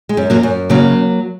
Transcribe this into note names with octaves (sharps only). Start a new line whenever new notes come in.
G#3
F#2
F#3 A#3
F#2
C#3 F#3 A#3